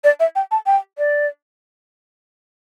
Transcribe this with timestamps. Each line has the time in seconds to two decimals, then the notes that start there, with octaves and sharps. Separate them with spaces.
0.04 D5
0.20 E5
0.35 G5
0.51 A5
0.66 G5
0.98 D5